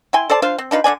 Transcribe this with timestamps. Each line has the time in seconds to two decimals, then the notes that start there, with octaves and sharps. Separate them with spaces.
0.13 E4 G5 G#5 C6
0.30 A4 C5 D5 A5
0.42 D4 F4 C5 F5
0.58 C4
0.71 D4 D#4 F4 B4
0.84 D3 D4 D5 G#5